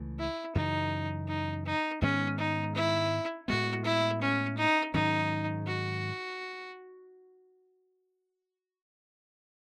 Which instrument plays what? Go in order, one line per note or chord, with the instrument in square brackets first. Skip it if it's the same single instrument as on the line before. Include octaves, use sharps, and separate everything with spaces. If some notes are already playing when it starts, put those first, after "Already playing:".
Already playing: [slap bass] C#2 C#3 E3 A3
[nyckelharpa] E4
[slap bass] F#2 C#3 E3 [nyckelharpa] D#4
[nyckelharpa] D#4
D#4
[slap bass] G#2 D#3 G#3 B3 [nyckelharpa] C#4
[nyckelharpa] D#4
E4
[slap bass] A2 G#3 B3 [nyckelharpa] F#4
[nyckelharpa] E4
C#4
D#4
[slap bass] G#2 D#3 F#3 C#4 [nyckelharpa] D#4
[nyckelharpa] F#4